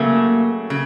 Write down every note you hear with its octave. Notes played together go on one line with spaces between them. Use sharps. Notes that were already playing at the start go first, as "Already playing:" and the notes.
Already playing: C#3 F#3 A3 A#3
C#3